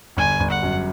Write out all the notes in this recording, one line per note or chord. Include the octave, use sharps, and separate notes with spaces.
G1 G#5
G1
F#5
F#2